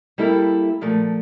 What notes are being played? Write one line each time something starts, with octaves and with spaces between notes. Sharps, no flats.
G3 A#3 E4 A4 E5
A#2 F3 A3